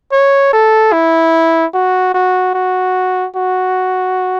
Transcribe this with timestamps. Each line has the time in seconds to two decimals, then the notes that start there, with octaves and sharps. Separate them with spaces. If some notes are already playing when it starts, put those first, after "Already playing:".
0.12 C#5
0.53 A4
0.93 E4
1.74 F#4
2.14 F#4
2.54 F#4
3.36 F#4